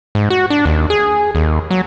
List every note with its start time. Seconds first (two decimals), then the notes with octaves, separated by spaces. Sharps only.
0.15 G#2
0.30 F#4
0.50 D4
0.65 D#2
0.90 G#4
1.35 D#2
1.71 F#3